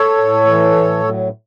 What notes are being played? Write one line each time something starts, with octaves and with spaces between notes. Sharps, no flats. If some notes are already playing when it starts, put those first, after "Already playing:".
Already playing: A4 C#5
A2
E3
A2
F#3